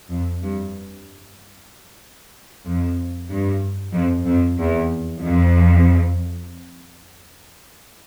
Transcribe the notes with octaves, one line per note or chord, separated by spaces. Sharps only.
F2
G2
F2
G2
F2
F2
E2
F2